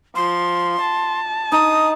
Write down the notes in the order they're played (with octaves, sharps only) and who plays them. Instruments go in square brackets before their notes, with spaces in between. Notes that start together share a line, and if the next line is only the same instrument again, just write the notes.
[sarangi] F3 [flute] C6
[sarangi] A5
[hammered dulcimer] D#4 [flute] D#6